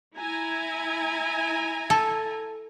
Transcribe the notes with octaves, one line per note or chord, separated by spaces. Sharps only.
E4 G#5 A#5
A4